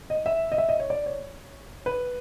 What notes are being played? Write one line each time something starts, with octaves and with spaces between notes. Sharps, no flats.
D#5
E5
D#5
E5
D#5
C#5
D5
C#5
B4